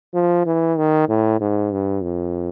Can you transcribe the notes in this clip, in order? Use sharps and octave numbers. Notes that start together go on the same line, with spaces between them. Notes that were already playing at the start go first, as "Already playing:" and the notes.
F3
E3
D#3
A2
G#2
G2
F2